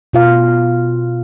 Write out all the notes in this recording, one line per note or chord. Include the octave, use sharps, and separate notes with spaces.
B2 F4 F5